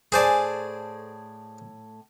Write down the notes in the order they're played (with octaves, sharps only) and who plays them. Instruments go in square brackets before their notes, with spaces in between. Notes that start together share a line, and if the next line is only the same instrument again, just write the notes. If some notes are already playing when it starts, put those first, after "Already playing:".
[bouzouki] A2 G#5 A5 [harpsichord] G#4 C5 D5